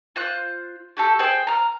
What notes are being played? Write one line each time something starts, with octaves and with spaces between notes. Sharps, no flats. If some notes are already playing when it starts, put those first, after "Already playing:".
F4 C5 F#6
F#4 G4 A4
G#4 C5 G5
A#5 F6